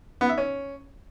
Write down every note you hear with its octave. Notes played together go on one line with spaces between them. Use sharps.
B3
E5
C#4